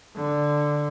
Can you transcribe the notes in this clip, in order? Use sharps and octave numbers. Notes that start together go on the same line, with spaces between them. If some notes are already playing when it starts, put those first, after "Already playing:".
D3